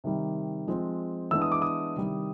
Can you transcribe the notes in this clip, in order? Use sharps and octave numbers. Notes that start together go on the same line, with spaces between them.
C3 D#3 G3
F3 G#3 C4
E3 G#3 B3 D4 E6
D#6
D6
D#6
C3 D#3 G3